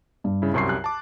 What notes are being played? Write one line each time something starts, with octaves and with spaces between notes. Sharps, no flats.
G2
C#3 E4
C2 F#2 C3 C6 C#6 C7
F#6
A5 D6